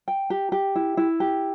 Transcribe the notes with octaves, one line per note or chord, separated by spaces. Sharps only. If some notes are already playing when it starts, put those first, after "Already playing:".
G5
G4
G4
E4
E4
G4